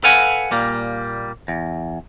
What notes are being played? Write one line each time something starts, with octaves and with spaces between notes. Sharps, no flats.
A4 B4 F5 F#5 G#5
A#2 G3 A#3
E2